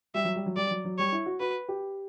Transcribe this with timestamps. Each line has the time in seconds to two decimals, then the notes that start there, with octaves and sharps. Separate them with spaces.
0.14 G3 E5
0.25 F#3
0.36 G3
0.46 F#3
0.56 G3 D5
0.71 F#3
0.85 F#3
0.98 G3 C#5
1.12 E4
1.26 F#4
1.40 F#4 B4
1.68 G4